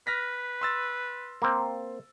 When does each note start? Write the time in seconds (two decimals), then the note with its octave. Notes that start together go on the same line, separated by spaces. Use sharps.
0.07 B4 F6 A#6 B6
0.61 C6 E6 A6
1.42 A#3 C4